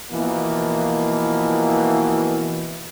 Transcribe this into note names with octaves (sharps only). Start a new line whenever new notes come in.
B2 E3 F3 A#3